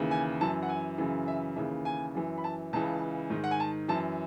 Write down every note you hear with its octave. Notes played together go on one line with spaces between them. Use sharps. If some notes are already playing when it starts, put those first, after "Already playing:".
Already playing: D#2 C#3 E3
G#5
F#2 E3 A5
F#5
G#5
F#2 C#3 E3
E5
D#2 C#3 E3 E5
G#5
F#2 E3
B5
A5
C#2 C#3 E3 A5
G#2 D#3
F#5
G#5
A5
F#2 E3 A5